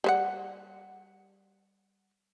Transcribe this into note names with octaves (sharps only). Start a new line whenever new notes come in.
G3 C5 F#5